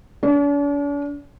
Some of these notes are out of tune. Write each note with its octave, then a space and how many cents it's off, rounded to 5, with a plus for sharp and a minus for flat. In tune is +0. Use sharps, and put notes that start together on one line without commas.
D4 -45